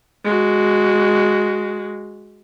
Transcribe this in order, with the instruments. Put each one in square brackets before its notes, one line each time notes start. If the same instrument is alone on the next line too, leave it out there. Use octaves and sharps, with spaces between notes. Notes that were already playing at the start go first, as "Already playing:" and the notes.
[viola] G#3 F#4